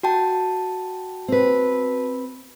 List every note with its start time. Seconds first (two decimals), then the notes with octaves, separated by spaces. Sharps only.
0.03 F#4 G5 A5
1.28 C4 B4